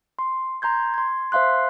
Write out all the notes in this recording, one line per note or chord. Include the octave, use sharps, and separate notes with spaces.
C6
A#5 C6 G6 G#6
C6 G#6
C5 E5 F5 C6 F#6